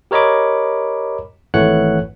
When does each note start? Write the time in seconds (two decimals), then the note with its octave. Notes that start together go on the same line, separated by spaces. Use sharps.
0.11 G4 A#4 C#5 D#5 B5 D6
1.54 G#1 E3 A3 C#5 F#5 F#6